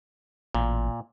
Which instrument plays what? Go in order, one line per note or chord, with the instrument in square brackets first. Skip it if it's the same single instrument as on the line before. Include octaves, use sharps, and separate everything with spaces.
[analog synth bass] A1 [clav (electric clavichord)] A#2